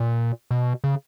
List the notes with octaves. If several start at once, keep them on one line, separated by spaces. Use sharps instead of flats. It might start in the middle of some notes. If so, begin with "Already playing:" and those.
Already playing: A#2
B2
C#3